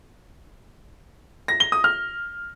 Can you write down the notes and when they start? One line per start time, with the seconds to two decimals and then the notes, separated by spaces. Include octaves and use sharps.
1.48 A#6
1.60 G7
1.72 D#6
1.84 F6